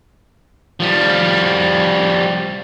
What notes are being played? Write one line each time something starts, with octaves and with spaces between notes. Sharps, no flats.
F3 G3